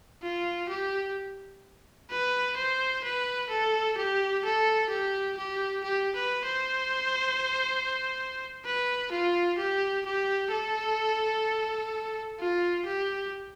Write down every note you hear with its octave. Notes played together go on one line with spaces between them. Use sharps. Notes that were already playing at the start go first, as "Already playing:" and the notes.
F4
G4
B4
C5
B4
A4
G4
A4
G4
G4
G4
B4
C5
B4
F4
G4
G4
A4
F4
G4